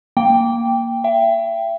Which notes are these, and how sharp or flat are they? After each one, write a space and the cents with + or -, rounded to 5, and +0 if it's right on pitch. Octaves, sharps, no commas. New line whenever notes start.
A#3 +0 G5 +5
E5 +35 G5 +0